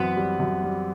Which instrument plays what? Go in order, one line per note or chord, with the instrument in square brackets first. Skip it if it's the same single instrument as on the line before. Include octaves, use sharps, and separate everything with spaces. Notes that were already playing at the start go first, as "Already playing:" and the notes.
Already playing: [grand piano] F#2 E3 C4 [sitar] B3
[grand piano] G3
F#2
G3